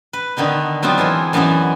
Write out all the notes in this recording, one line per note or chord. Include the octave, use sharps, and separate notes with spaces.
B4
D3 D#3 B3 D#4
F#3 B3 C4 D4 F4
E3 G#3 C5 G#5
F#2 E3 B3 D#4 F#4